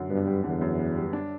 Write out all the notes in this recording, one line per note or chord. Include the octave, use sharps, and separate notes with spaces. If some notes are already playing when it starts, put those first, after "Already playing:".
Already playing: F#2 D3
G2 B3
G3
E2 D3
F#2
B3
G3
D4